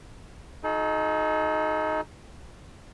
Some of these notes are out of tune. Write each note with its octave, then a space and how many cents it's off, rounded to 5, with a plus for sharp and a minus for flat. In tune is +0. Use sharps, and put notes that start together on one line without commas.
D#4 +5 F#4 -35 A4 -45